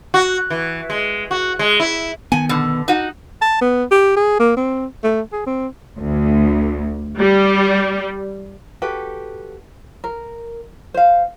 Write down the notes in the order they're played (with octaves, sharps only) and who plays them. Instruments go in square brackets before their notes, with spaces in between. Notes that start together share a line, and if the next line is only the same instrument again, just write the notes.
[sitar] F#4
E3
G#3
F#4
G#3
E4
[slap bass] D#3 B3 [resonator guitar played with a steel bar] G#5
[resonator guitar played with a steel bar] B2 D3
D#4 F#4
[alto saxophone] A5
B3
G4
G#4
A#3
C4
A3
G#4
C4
[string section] D2
G3
[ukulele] F#4 G4 A4 B4
A#4
C5 F5